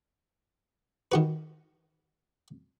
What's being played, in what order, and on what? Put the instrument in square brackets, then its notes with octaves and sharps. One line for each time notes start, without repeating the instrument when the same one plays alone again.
[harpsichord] D#3 F#4 B4